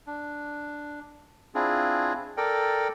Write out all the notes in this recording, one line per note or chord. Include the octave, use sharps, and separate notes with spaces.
D4
C4 D4 E4 F4 G#4
A4 A#4 D5 G5